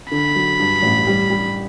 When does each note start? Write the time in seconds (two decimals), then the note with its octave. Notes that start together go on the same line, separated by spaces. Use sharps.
0.11 D3 B5
0.35 F#3
0.59 G2
0.82 A1
1.07 G3
1.30 G3